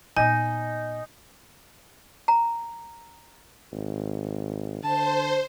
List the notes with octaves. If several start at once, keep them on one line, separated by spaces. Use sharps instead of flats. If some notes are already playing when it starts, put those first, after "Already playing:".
A#2 B3 D#4 G#5
A#5
G#1
D3 C5 A5